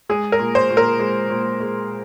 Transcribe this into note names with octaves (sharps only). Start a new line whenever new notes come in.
G#3 G#4
A#4
A#2
C5
A#2
A#4
G#3
A#2
G#3